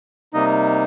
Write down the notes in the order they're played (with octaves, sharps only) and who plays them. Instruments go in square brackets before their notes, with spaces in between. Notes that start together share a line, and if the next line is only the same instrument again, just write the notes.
[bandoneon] C3 G3 A#3 D#4 D#5